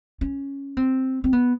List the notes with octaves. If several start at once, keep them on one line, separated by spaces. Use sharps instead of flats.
C#4
C4
C4
B3